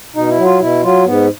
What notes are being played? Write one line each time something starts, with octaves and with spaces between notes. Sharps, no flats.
B2 D#4
E4
F#3
F4
B2 E4
F#3 F4
G#2 B3